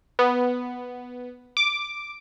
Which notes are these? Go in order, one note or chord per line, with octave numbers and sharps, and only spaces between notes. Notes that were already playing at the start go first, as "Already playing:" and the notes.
B3
D6